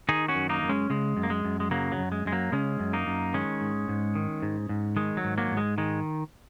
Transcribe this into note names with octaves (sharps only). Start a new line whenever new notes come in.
D#3 D#4 G#4
C#4 F#4
F#2
A#3 D#4
F#2
G#3 C#4
C#3 G#3
F#2
A#3
G#3
F#2
G#3
C#3 F#3 A#3
F#3
F#2
G#3
F#2 G#3
F#3 A#3
C#3 G#3 C#4
F#2
A#3 D#4
F#2
D#3 G#3 C#4
G#2
G#2
D#3
G#2
G#2
D#3 G#3
F#3
G#2
F#3 A#3
G#2
G#3
D#3 G#3